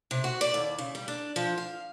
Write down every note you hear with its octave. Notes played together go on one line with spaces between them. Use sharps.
C3
F#4
D5
D#2
C#3
G3
D4
F3
F5